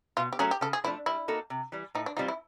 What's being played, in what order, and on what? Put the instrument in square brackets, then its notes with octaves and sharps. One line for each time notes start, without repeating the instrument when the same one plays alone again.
[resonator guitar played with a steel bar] B2 [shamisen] F4
[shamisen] G4
[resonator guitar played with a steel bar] F#3 A3 C#4 [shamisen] G#4
[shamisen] G4
[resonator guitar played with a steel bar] C#3 [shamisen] A4
[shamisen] G#4
[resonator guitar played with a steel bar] F3 A3 D4 [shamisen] E4
[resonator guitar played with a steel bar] G3 [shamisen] E4
[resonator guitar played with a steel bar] A#3 D#4 F#4 A4
C3
E3 G3
[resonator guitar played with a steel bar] A2 [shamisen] D#4
[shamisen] D4
[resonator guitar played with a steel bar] E3 G3 C4 F4 [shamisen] D#4
[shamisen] E4